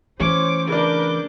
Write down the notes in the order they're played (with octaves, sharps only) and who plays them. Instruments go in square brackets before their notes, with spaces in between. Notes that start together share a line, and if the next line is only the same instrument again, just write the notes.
[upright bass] E3 A3 [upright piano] C#4 [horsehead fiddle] C5 C#5 [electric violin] D6
[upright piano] C#3 D4 [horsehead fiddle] A#4 B4 [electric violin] D6 G6